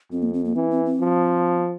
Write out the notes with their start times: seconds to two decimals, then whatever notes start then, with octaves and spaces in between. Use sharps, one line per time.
0.11 F2 C4
0.23 A#3
0.34 C4
0.45 A#3
0.55 E3 C4
0.71 C4
0.85 C4
1.00 F3